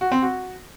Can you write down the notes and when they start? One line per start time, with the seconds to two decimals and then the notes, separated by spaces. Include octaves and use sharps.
0.01 F#4
0.12 C4
0.22 F#4